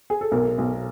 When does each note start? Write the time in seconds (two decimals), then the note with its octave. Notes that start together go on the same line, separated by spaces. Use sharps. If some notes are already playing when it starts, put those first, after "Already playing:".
0.10 G#4
0.21 A4
0.32 B1 A#4
0.58 B1